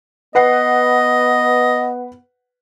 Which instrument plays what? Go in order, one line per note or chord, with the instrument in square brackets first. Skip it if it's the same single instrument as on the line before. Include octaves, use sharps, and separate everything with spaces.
[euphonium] B3 [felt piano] B4 F#5 C7 [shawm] D#5